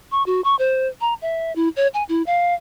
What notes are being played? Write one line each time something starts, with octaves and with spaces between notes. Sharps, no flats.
C#6
F#4
C#6
C5
A#5
E5
E4
C#5
G#5
E4
F5